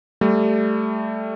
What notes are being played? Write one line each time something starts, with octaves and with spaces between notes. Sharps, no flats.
G3 A3